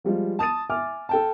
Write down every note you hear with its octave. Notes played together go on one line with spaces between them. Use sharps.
F3 G3 G#3 F4
A5 D#6 A6 D#7
E5 G#5 D6 F6
A4 G5 A5